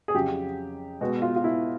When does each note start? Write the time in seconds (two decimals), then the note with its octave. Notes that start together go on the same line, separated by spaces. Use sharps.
0.08 G#4
0.14 F2 C#3 F#3 G4
1.01 B2 G#3 B3 F#4
1.22 F4
1.36 F4
1.44 E4